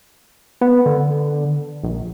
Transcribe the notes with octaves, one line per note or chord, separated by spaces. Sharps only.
B3
D3
A#1